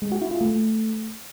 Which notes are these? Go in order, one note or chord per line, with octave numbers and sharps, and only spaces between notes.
G#3
F#4
E4
F4
A3